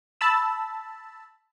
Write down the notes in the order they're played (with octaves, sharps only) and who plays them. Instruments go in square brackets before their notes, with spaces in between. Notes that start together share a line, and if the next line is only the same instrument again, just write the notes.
[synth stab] A5 B5 E6